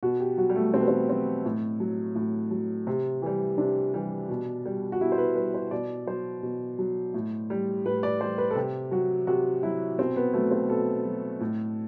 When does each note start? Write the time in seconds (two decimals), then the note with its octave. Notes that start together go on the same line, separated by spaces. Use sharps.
0.03 B2 F#4
0.20 G4
0.37 F#3 F#4
0.49 G3
0.55 A3
0.73 B2 C4
0.81 B3
0.88 C4
1.09 F#3 C4
1.45 A2
1.80 F#3
2.15 A2
2.51 F#3
2.87 C3
3.22 E3 G3
3.58 C3 D4
3.94 E3 G3
4.29 B2
4.66 G3
4.92 F#4
5.00 B2 E4
5.12 C5
5.18 B4
5.35 G3 B4
5.54 C5
5.71 B2 D5
6.07 F#3 C5
6.43 B2
6.79 F#3
7.14 A2
7.50 G3
7.85 A2 B4
8.03 D5
8.20 G3 C5
8.38 B4
8.51 A4
8.56 C3 G4
8.91 F#3 F#4
9.27 C3 F#4
9.63 F#3 E4
9.98 B2 C4
10.16 B3
10.34 F#3 A3
10.51 C4
10.69 B2 A4
11.05 F#3
11.41 A2